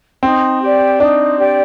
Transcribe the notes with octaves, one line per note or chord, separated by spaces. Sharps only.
C4 D#4
G4 D5
D4 D#4
G4 D5